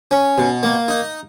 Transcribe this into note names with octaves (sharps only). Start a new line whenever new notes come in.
C#4
B2
A#3
D#4